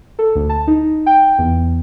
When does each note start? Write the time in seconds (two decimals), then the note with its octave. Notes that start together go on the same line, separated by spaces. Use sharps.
0.19 A4
0.35 D2
0.49 A5
0.67 D#4
1.06 G5
1.38 E2